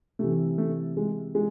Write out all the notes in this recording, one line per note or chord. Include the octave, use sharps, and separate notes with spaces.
C3 E3 A3
A3
G#3
G#3